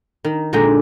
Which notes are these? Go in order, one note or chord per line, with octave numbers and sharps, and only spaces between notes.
D#3
A#2 D3 G#3 D#5 G5 A#5